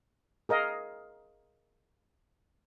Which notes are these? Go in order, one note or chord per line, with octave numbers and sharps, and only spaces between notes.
G#4 A#4 D#5 F5